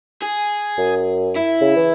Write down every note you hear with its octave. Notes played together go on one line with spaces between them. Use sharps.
G#4
F#2
E4
C#3
E3